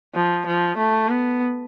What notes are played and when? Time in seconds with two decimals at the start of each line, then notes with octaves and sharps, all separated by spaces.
0.15 F3
0.46 F3
0.77 A3
1.09 B3